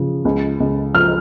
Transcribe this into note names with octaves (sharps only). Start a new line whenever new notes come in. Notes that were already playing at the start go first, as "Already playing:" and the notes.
Already playing: C#3 F3
C#2
C#2
F3 F6